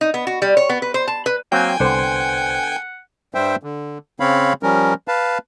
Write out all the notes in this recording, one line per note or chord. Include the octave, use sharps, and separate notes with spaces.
D#4
B3
F#4
G3
C#5
B3
B4
C5
A5
B4
F#3 A#3 C4 G5 G#5
C2 D3 B3 C5 F#5 C6
G2 G3 C5 E5 G5
D3
C#3 C4 C#5 F5 B5
F3 G3 C#4 A#4
B4 F5 A5